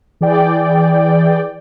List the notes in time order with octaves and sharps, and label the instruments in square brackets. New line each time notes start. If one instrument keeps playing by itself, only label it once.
[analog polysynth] E3 G#4 D5 G5